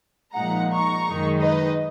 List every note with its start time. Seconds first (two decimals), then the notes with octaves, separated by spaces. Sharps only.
0.35 A#2 F3 G#3 D#4 F#5 A#5
0.72 A#5 C#6
1.07 F#2 D#3 G#3 D#4
1.43 B4 D#5